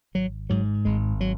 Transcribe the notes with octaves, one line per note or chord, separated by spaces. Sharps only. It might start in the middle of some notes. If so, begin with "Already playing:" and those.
G#1 F#3
G#2 F#3
G#1 G#3
F#3